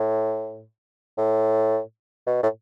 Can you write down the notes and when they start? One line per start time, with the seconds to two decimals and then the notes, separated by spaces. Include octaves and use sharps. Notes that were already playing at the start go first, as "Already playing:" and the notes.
Already playing: A2
1.18 A2
2.26 B2
2.43 A2